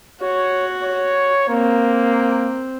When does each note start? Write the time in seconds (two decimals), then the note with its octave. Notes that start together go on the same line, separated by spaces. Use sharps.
0.22 F#4 C#5
0.84 C#5
1.49 A#3 C4